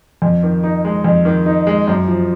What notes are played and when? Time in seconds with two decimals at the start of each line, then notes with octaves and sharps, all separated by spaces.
0.22 F2
0.43 D#3
0.64 D#4
0.85 G#3
1.04 F2
1.25 D#3
1.46 D#4
1.67 G#3
1.88 F#2
2.08 F3